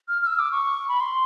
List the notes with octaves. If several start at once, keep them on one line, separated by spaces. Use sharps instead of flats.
F6
F6
E6
D6
C#6
B5
C6